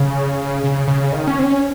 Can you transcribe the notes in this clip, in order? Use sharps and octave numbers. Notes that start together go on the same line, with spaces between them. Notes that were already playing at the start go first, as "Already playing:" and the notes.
Already playing: C#3
C#3
C#3
D#3
C#4
C4
C#4